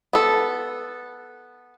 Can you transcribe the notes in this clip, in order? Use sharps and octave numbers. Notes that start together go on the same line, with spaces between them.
B3 A4